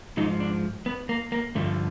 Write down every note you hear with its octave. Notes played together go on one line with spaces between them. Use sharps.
G#2 F3 D#4
D4
B3
A#3
A#3
G2 D3 F3 A3